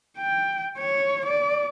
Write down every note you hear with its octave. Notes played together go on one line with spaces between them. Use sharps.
G5
C#5
D5